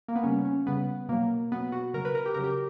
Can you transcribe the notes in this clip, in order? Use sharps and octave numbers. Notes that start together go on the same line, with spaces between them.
A#3
B3
C#3 G3 C#4
C#4
C#3 G3 B3
B2 F#3 A#3
B2 F#3 B3
F#4
C#3 F#3 A#4
B4
A#4
G4
C#3 F#3 A#4
G4